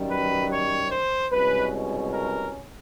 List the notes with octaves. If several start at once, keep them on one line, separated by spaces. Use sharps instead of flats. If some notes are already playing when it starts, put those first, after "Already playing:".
Already playing: F#2 D#3 G3
B4
C#5
C5
C2 B2 G#3 C#4 B4
A#4